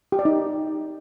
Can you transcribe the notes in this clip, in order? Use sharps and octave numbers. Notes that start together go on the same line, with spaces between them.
G4
D5
D#4